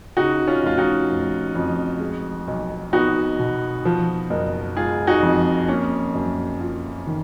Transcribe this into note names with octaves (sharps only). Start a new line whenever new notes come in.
C#3 D#4 F#4
C#4 F4
F1 F4
D#4 F#4
F1
F2
G#3
B1
B3 D#4 F#4
B2
F3
F#1
G#3 F4 G#4
D#4 F#4
F2
A#3 C#4
F#2
F4
D#3